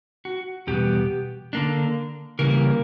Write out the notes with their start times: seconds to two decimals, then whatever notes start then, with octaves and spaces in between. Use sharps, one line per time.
0.25 F#4
0.67 E2 B2 G3 B3 G4
1.53 D3 A#3 D4
2.39 C#3 E3 G3 A#3 A#4